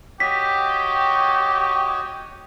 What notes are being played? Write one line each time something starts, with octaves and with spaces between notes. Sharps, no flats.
F#4 G4 C#5 D#5 B6